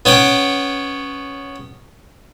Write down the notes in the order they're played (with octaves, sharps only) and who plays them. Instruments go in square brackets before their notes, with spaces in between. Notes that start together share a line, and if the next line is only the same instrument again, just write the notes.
[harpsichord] B3 C#4 F#5 G5